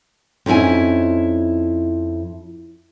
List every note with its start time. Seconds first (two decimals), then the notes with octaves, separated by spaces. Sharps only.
0.46 F2 C#4 D#4 E4 G#5